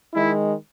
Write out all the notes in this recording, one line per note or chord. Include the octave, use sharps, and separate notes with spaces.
D#3 G#3 E4